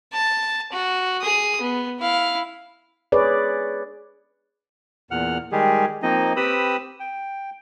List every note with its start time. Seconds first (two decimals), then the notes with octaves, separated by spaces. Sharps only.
0.13 A5
0.72 F#4
1.22 G#4 D#6
1.61 B3
2.00 E4 F5
3.12 G#4 B4 C#5 D5
5.11 E2 A#2 F#5 F6
5.52 D#3 G3 G#3 G4 G#4
6.03 F3 A#3 C4 D#4 D#5
6.36 C4 G4 B4 B5 D#6 E6
7.00 G5